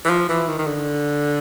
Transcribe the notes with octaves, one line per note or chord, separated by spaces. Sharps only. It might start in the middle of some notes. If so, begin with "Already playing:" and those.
E3
F3
E3
D#3
D#3
D3